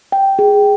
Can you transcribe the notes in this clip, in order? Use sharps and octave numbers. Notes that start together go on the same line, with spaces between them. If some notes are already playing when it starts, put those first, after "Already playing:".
G5
G#4